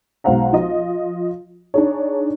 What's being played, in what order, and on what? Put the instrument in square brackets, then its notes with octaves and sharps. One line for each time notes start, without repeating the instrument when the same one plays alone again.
[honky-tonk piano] B1 G#3 C5 F5 F#5 A#5
F3 F4 D#5
D4 D#4 G#4 C#5